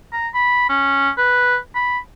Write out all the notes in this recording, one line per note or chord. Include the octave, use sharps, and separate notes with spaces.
A#5
B5
C#4
B4
B5